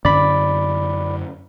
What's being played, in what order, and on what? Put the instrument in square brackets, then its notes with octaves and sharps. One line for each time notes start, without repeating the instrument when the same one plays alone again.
[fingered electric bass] F#2 D3 D4 [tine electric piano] D5 B5